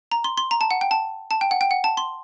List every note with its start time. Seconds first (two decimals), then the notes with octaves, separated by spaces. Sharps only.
0.12 A#5
0.24 C6
0.38 C6
0.51 A#5
0.61 A5
0.71 F#5
0.81 G5
0.91 A5
1.31 A5
1.41 G5
1.51 F#5
1.61 G5
1.71 F#5
1.84 A5
1.97 C6